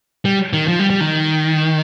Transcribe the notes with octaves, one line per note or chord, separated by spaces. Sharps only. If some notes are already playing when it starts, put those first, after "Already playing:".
G3
D#3
F3
G3
G3
D#3